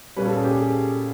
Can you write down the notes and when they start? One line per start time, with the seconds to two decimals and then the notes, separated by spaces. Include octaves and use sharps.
0.16 A#2 G3 A#3 C#4 B4
0.26 A4
0.35 G#4
0.44 G4
0.53 G#4